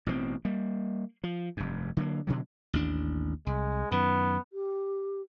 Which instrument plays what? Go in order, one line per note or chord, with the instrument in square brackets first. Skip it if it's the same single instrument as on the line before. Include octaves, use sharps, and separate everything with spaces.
[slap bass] A1 B2 D3 C4
G3 A#3
F3
F1 G2
D3 F#3 A#3
B2 D3 F#3
A1 D#2 D4
[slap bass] C2 [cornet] G#3
[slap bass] F#2 D#3 [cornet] B3
[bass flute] G4